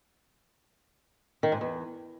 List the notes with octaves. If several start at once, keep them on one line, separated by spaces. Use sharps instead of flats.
D#3
G#2
E2